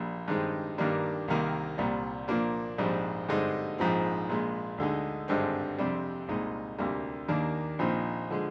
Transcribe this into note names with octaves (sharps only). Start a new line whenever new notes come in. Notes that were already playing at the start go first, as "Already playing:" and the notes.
Already playing: A#1 A#2 G3
G2 D#3 G#3 C4 D#4
G2 D#3 G3 A#3 D4
C2 C3 D#3 A#3
C2 A#2 G3
A#2 F3 A#3 D4
A#1 G#2 G3 C4
G2 D3 G#3 C4 D#4
A#1 G#2 F3 C4
A#1 A#2 F3 G#3
D2 D3 G#3 D#4
G#1 G2 D3 G#3 C4
F2 C3 G3 D4
C2 A#2 G#3 D#4
D2 C3 G3 A#3
D#2 D#3 A#3 D4
A#1 A#2 F3 C4 D#4
D3 F3 G#3